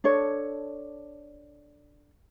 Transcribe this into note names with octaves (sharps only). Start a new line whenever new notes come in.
D4 A4 C#5